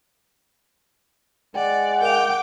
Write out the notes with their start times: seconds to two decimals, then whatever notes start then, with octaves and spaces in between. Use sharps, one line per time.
1.55 G#3 D5 F#5 G5
2.01 A#4 F5 G5 D6 F7